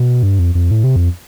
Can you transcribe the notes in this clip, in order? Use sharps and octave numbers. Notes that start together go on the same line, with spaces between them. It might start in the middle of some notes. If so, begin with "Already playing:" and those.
Already playing: B2
G2
F2
F2
A2
C3
F2